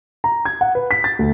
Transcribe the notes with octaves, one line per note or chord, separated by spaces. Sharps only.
A#5
G#6
F#5
B4
B6
A6
D2